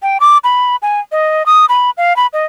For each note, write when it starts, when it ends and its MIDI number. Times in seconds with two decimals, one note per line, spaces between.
0.02 0.18 79
0.20 0.38 86
0.44 0.76 83
0.82 1.00 80
1.12 1.45 75
1.46 1.66 87
1.69 1.91 83
1.97 2.16 77
2.16 2.27 83
2.33 2.46 75